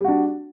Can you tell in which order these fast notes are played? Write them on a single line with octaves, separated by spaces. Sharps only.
G3 F#4 D4